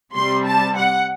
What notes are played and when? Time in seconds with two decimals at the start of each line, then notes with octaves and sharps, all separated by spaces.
0.14 C3 G3 C4 C6
0.45 A5
0.76 F#5